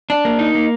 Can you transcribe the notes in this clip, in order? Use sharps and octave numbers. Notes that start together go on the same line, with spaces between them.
D4
A#3
D#4
A#3